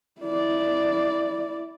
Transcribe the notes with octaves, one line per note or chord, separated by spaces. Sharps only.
E4 D5